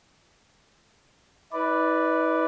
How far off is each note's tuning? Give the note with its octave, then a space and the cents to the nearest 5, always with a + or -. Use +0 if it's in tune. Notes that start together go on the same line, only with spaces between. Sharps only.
E4 -45 B4 +0 D5 +0